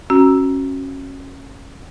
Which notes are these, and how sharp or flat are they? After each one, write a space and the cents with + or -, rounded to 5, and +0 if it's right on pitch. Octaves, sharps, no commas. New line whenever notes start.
C#4 -20 F#4 +0